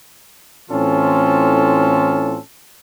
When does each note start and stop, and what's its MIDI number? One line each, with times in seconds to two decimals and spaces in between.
0.70 2.39 45
0.70 2.39 52
0.70 2.39 60
0.70 2.39 61
0.70 2.39 65
0.70 2.39 69